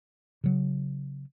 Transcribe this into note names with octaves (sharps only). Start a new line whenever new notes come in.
C#3 F#3